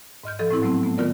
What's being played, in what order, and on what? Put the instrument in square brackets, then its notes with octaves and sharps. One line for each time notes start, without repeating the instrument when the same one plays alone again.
[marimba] G#2 D#5 F6 G6
F3 A4 D#5
A2 C4 E4 E6
F#3 A3 B3 C4
A3 B3
D#3 B3 F4 A#4 D5